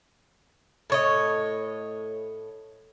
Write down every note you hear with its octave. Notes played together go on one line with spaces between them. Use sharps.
A2 C#5 D#5